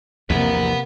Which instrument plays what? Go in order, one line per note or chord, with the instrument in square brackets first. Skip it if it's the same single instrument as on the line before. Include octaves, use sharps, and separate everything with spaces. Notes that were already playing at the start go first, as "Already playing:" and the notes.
[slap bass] A#1 E2 G#2 [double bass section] C3 A#3 [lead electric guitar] B4 F#5